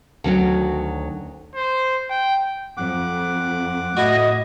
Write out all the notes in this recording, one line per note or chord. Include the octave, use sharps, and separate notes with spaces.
D2 D#3 F#3 C#4 F#4 G5
C5
G5
F2 F#5 D6
A2 E4 F#4 D#5